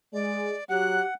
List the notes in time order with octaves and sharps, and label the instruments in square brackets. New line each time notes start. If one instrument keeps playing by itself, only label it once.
[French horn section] G#3 [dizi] D5
[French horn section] F#3 [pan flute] G4 [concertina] F#5 [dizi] F#6